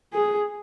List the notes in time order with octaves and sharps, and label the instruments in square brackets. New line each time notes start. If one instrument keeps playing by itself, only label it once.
[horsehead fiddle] G#4